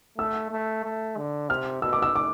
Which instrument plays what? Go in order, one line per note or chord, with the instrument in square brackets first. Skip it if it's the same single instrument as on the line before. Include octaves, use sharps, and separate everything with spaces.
[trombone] A3 [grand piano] E6
[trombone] A3
A3
D3
[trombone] C3 [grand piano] F6
[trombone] B2 [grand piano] E6
[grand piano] D6
E6
D6